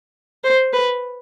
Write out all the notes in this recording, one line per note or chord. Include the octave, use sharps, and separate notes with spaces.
C5
B4